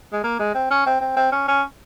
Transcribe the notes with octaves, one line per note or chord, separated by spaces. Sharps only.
G#3
A#3
G#3
C4
C#4
C4
C4
C4
C#4
C#4